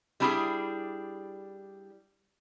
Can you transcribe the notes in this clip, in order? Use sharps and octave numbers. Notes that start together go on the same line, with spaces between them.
G3 D4 E4 F4 G4 G#4